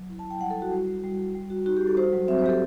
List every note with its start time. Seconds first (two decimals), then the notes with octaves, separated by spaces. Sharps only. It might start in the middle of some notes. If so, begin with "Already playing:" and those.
Already playing: F#3
0.10 E4
0.19 A5
0.25 E4
0.31 G5
0.40 G3 F#5
0.50 A4
0.56 E4
0.62 F#4
0.72 G3
0.87 G3
1.04 G3
1.19 G3
1.35 G3
1.50 F#4
1.66 D#4 F#4
1.77 G4
1.82 G3
1.87 A4
1.97 F#4 C5
2.13 F#3
2.28 C4 E5
2.39 C5
2.44 F#3 G4
2.50 A4